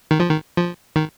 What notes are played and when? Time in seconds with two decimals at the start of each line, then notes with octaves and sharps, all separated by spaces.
0.11 D#3
0.20 F3
0.29 D#3
0.57 F3
0.96 D#3